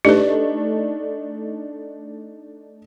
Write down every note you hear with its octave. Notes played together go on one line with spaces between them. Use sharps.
A3 D4 D#4 G4 B4